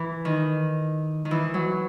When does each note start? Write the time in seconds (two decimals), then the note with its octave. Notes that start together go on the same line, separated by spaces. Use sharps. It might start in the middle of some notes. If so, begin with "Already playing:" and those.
Already playing: E3
0.25 D#3
1.25 D#3
1.31 E3
1.54 F#3